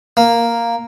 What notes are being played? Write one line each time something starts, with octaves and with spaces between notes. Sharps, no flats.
A#3